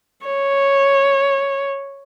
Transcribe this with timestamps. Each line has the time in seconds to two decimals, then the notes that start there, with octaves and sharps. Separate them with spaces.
0.26 C#5